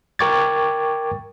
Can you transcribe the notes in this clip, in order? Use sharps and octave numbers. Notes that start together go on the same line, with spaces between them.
A#4 G5 C#6 D6 G#6 A6